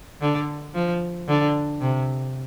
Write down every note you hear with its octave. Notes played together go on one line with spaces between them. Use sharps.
D3
F3
D3
C3